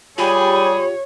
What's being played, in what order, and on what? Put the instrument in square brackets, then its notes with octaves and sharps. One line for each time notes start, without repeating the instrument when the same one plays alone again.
[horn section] G3 G#4 [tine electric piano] F4 G4 [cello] C#5 [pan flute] B5